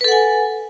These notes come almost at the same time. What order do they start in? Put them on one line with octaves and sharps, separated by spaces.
B4 A4 F#5 G#5